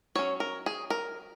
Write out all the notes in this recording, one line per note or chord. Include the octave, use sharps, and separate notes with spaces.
F#3 C#4 C#5
A#4
G#4
A#4